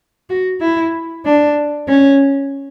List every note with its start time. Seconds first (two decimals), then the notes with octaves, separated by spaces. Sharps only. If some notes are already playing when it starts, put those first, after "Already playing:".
0.30 F#4
0.61 E4
1.25 D4
1.89 C#4